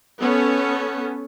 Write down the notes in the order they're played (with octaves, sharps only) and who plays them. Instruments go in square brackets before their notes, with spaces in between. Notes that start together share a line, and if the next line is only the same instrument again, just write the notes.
[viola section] B3 C#4 A4